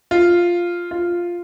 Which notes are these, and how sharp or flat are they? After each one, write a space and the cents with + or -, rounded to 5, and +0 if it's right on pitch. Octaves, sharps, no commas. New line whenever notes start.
F4 +0
F4 +0